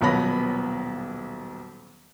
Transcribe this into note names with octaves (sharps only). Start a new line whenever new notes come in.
D#1 B1 B3 C#5 B5 A#6